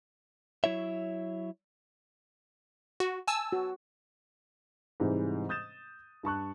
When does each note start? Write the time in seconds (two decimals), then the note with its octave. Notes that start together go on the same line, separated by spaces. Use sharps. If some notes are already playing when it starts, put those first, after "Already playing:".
0.64 F#3 E4 C#5 E5
3.00 F#4
3.27 G#5 A5 E6
3.52 F#4
5.00 G#2 C3 E3 G3 G#3
5.49 D#6 G6 A6 E7
6.23 G2 A5 C#6 F#6